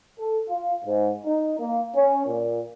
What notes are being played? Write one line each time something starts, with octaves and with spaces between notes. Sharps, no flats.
A4
F4
G#2
D#4
A#3
C#4
A#2